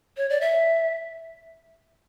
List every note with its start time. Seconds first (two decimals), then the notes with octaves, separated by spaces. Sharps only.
0.17 C#5
0.30 D5
0.41 E5